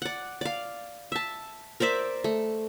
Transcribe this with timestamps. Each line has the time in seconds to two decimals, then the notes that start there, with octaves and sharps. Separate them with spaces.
0.02 D5 F#5
0.41 D5 F5
1.12 E5 A5
1.80 A#4 C5 D5 E5
2.24 A3